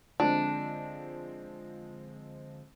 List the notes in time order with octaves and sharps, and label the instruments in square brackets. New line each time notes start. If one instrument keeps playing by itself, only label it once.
[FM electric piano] D3 [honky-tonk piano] F3 G#3 C4 [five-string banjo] D4